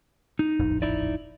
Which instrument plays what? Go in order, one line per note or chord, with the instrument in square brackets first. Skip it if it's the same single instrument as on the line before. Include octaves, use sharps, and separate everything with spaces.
[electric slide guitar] D#4
[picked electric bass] D#1 A1 F2
[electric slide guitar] D#4 E4 D5